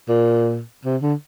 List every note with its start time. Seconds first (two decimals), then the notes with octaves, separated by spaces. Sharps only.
0.09 A#2
0.85 C3
1.02 D3